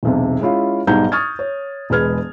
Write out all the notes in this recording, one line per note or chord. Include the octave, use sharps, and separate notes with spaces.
E1 B1 C3
G#3 C#4 E4 F4 F5
B1 G#2 G3 F#5 A#5 G6
C#6 D#6 F6 G#6 A6
C#5
E1 G#3 B4 F6 G#6